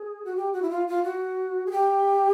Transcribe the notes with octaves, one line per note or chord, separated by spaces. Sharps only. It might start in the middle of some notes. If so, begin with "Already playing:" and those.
Already playing: G#4
F#4
G4
F#4
E4
F4
F4
F#4
G#4
G4